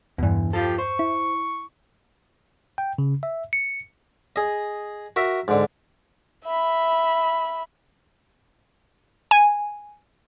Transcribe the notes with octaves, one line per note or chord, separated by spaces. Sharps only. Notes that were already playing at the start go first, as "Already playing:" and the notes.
E2 G2 B2 E3
F3 F4 G4 A4
C5 C#6
E4
G5
C#3
E5
C#7
G#4 D#5
F#4 A#4 E5
G#2 D3
E5 B5
G#5